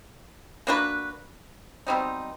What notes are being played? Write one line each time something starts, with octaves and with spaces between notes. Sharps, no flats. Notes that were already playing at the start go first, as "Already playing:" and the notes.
A#3 D4 F#4 B4
B2 G3 C4 D#4